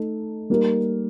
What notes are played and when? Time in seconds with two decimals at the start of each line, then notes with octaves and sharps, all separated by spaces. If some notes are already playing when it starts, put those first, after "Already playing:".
Already playing: A3 D#4 A4
0.50 G3 A#3 D#4 A#4